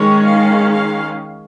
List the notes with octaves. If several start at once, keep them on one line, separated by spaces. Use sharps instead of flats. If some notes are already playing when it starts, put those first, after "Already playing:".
Already playing: D#3 G#3 C#4 C#5
F5
F5